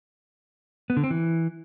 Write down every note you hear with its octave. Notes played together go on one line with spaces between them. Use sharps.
B3
D3
C4
E3